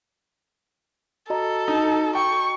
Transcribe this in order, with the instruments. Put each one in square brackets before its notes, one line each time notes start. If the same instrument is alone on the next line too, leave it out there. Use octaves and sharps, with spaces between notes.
[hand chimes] F#4 D#5 A#5 [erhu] A4
[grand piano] D#4
[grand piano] G5 [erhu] C#6